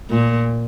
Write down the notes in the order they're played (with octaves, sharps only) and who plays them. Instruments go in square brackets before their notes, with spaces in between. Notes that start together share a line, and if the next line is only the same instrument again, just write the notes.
[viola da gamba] A#2